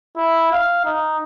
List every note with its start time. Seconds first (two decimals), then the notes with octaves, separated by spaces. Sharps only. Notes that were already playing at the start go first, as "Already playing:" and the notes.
0.17 E4
0.52 F5
0.85 D#4